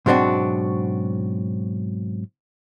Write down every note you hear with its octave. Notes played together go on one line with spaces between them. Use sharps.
G#2 B2 F#3 C4 D4 F#4